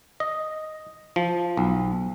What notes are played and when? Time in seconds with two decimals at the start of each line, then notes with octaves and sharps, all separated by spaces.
0.20 D#5
1.16 F3
1.57 B1